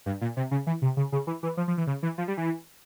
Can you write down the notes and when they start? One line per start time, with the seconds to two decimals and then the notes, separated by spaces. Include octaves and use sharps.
0.06 G2
0.21 A#2
0.37 C3
0.51 C#3
0.67 E3
0.82 C3
0.97 C#3
1.12 C#3
1.27 E3
1.43 E3
1.57 F3
1.68 F3
1.78 E3
1.87 C#3
2.03 E3
2.18 F3
2.28 G3
2.37 E3